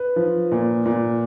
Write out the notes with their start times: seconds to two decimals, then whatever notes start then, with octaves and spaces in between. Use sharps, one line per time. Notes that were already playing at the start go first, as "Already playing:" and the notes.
Already playing: B4
0.16 F3
0.51 A#2
0.86 A#2